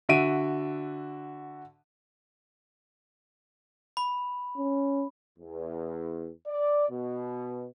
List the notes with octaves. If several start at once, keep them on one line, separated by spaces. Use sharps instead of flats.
D3 F#4 E5 D7 D#7
B5
C#4
E2
D5
B2